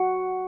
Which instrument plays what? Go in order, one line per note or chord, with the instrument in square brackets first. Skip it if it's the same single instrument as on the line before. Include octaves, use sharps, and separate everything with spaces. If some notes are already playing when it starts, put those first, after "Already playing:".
Already playing: [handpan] F#4